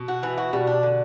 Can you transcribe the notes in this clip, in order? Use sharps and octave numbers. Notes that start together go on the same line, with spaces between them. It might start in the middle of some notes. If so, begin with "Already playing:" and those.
Already playing: B2
F#4
E3
F#4
B2 G3
D4
D3